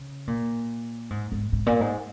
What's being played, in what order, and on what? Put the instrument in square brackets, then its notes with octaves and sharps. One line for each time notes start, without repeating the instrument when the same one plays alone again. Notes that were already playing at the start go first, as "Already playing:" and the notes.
Already playing: [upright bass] C#3
A#2
G#2
G#2
G#2
A#2
G#2